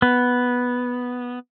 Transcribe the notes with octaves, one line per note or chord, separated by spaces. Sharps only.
B3